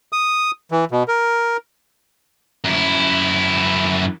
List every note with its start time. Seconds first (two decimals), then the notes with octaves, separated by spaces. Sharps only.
0.13 D#6
0.71 E3
0.91 B2
1.08 A#4
2.65 F#2 E4